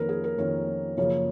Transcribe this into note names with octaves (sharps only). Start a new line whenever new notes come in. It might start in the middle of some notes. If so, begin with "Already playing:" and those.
Already playing: F2 D#3 A#3 C#4 A#4 B4
G#4
A#4
F2 D#3 A#3 C#4
F#2 C#3 F3 A#3 C#4